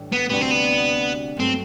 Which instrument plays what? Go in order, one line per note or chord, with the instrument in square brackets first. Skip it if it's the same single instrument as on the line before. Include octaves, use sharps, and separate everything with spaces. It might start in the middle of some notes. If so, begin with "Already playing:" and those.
Already playing: [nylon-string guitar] A2 E3 G3 D4
[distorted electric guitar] B3
[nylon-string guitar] D2 C3 G3 D4 F#4 [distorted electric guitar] B3
[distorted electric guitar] C4
B3
[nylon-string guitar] G2 F#3 A3 [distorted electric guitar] C4